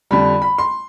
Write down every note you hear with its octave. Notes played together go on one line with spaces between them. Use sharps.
F2 D3 G3 B5
B5
C6